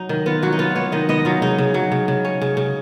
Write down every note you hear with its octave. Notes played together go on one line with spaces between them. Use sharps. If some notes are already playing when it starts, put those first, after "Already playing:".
Already playing: F#3 D#4
D#3
B3 F4
F#3 F#4
D#4
B3 F4
B3 C#5
D#3 D#5
B3 D#5
F#3 F4
C#3 D#4
C#3
F#3
C#3
C#3
C#4
C#3
C#3